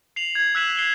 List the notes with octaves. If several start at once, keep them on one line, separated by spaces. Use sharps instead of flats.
C7 F7 F#7
G#6
E6 F#6 B6 E7 F#7
C7 E7 F7 G7